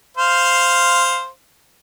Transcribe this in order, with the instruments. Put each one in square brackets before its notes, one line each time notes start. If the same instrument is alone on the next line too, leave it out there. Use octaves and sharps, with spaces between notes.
[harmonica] C5 F5